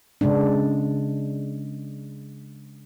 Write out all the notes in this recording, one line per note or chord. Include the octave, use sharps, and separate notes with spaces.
C#3 G#3 D4